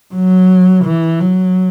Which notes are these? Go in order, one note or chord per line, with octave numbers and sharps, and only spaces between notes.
F#3
E3
F#3